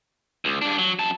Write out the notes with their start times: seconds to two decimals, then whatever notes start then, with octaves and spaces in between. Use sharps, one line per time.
0.45 C#2
0.62 G2 D4
0.79 F#3
0.99 F#2 A5